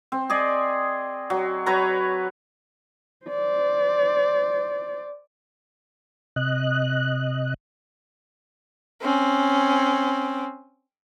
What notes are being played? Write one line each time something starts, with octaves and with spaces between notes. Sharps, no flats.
C4
G#4 D5 D#5
F#3
F#3 B4 C#5 A#5
C5 D5
C3 D#5 F#6
C4 C#4